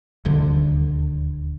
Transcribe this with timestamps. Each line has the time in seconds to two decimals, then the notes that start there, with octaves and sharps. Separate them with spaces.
0.25 D#1 D2 D3